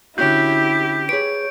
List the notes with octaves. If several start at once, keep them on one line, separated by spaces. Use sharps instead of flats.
D3 C#4 E4 F#4 G4 G6
G#4 B4 C#5 D7